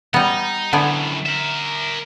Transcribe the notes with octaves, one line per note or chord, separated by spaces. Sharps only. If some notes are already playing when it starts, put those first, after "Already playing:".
G3 B3 D#4
F#2 A2 D3 B3 G#5
A#4 E5